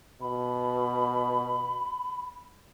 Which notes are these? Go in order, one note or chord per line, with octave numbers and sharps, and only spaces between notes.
B2 B5